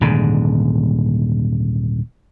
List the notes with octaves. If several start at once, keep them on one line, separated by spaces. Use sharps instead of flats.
D#1 G#2 D3